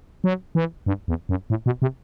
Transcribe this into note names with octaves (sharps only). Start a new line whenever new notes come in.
F#3
E3
G2
E2
F#2
A2
B2
C3